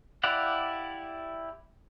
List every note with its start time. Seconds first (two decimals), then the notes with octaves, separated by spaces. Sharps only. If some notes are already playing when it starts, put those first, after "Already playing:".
0.23 E4 G4 D5 F5 F#5